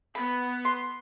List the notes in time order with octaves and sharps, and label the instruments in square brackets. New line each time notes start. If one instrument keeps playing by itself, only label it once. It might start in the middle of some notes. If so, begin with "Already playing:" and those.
[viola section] B3 [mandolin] B5
[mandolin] C6